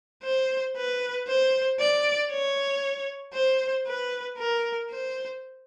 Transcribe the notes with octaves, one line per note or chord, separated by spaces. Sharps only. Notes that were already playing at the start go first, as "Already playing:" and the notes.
C5
B4
C5
D5
C#5
C5
B4
A#4
C5